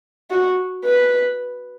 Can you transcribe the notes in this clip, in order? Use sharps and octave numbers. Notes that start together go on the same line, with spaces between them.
F#4
B4